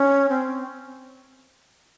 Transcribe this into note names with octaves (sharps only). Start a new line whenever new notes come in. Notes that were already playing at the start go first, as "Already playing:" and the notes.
Already playing: C#4
C4